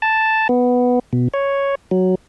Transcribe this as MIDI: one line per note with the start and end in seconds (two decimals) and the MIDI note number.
0.02 0.48 81
0.49 0.99 59
1.13 1.28 47
1.34 1.75 73
1.91 2.15 54